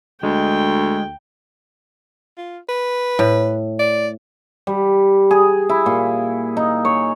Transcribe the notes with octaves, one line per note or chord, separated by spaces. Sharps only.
D2 G#3 G5
F4
B4
A2
D5
G3
G#4
E4
A#2
D#4
C#5